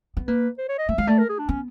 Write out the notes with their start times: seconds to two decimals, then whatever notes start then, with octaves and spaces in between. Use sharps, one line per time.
0.17 B3
0.28 A#3 B4
0.58 C5
0.69 C#5
0.78 D#5
0.88 A3 E5
0.98 G#3 F5
1.07 A3 D5
1.19 A#4
1.29 G#4
1.39 D4
1.49 B3 C#4